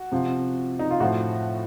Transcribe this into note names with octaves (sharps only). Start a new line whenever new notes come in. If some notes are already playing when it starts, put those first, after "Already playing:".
Already playing: F#4
C3 F3
D#4
F4
A2 F3 F#4